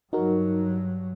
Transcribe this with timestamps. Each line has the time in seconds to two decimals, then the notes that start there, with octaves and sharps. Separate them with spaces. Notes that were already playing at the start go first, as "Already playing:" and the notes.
0.13 G2 F#3 D#4 F#4 A#4